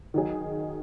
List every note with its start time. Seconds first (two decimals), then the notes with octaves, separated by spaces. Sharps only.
0.14 D#3 F#3 D#4 G#4